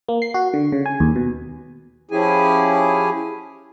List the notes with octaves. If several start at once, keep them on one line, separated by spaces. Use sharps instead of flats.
A#3
C7
F#4
D3
C#3
G#5
D#2
B2
F3 C#4 E4 G4 G#4 G#5